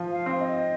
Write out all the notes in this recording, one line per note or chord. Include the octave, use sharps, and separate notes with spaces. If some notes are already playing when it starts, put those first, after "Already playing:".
Already playing: F3 F4
F5
C4
D#5